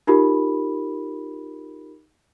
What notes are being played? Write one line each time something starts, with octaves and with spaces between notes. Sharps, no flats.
D#4 F4 G4 A#4 B5